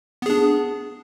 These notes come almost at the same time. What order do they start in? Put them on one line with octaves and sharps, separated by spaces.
B3 G#4 D4